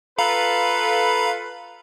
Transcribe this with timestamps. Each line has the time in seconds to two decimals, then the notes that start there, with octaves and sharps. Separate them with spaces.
0.19 F4 A4 B4 F5 A#5 B5